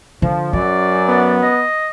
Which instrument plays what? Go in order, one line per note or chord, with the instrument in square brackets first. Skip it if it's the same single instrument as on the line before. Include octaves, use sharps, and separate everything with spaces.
[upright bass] D3 [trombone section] F3
[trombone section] F#2 [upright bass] F#3 [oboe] D5
[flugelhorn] B3
[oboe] D#5